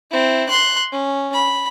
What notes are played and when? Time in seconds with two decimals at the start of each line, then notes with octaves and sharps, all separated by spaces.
0.11 C4 E4
0.49 C6 F#6
0.92 C#4
1.34 B5